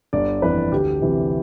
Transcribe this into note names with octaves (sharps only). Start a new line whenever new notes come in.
G1 D5
F2 E3 B4
D2 G4
C3 E3